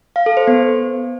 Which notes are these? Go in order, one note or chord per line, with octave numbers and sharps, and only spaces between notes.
F5
A4
C5
B3